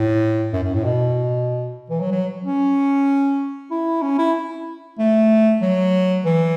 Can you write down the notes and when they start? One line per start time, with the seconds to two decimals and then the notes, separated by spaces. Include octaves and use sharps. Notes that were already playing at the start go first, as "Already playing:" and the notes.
Already playing: A2
0.53 F#2
0.63 F#2
0.74 A2
0.84 B2
1.90 E3
2.01 F#3
2.12 F#3
2.44 C#4
3.71 E4
4.02 C#4
4.19 E4
4.99 A3
5.62 F#3
6.25 E3